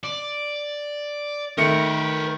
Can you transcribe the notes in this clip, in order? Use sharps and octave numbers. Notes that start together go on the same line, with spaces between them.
D5
D#3 A3 A#4 B4 C#7